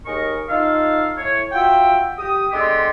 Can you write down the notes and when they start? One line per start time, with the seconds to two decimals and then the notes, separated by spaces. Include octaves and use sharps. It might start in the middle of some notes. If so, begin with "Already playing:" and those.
0.06 D#2 G#4 A#4 D#5 C#6
0.48 D#4 F4 A4 F5
1.18 A2 C#5
1.52 F4 F#4 E5 G5
2.18 G4 D#6
2.52 D3 G#3 B3 C4 G4